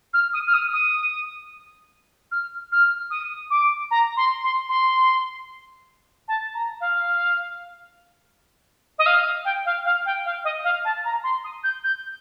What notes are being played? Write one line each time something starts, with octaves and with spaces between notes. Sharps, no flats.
F6
D#6
F6
D#6
D#6
F6
F6
D#6
D6
A#5
C6
C6
C6
A5
A#5
F5
D#5
F5
G5
F5
F5
G5
F5
D#5
F5
A5
A#5
C6
D#6
G6
G6